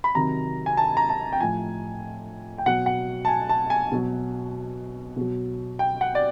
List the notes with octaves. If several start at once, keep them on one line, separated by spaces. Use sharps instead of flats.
B5
C3 D#3 F#3 A#5
G#5
A5
A#5
A5
G5
A2 F3 G#5
G5
B2 F#3 F#5
F#5
A5
G#5
A5
G#5
B2 F#3
B2 F#3
G5
F#5
D5